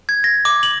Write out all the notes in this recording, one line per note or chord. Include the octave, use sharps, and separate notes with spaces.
G#6
A#6
D6
F#7